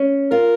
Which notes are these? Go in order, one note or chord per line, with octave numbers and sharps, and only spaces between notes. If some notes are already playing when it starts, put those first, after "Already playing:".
Already playing: C#4
F4 A#4